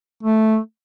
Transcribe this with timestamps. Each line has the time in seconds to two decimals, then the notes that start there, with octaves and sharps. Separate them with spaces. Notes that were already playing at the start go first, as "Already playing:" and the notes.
0.23 A3